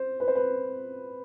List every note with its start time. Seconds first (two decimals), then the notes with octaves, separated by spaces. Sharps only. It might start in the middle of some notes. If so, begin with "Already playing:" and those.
Already playing: C5
0.20 B4
0.28 C5
0.35 B4